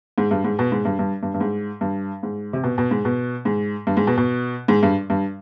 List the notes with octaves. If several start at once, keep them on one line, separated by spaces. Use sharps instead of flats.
G#2
G2
G#2
B2
G#2
G2
G2
G2
G2
G#2
G2
G#2
C3
B2
B2
G#2
B2
G#2
G2
G#2
B2
B2
G#2
G2
G2